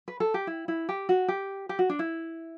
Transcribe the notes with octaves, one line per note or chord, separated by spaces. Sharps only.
B4
A4
G4
E4
E4
G4
F#4
G4
G4
F#4
D4
E4